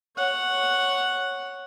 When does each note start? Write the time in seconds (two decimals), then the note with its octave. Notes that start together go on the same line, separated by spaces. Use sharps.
0.17 C#5 F#5